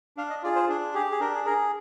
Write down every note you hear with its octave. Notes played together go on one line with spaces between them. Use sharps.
D4 F5
D#5
F4 G#4 D5
C5
D4 G#4
G4 G#4
G#4
D4 A#4
G#4
G#4 A#4